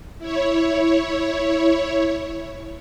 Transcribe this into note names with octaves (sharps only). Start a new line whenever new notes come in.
E4 C#5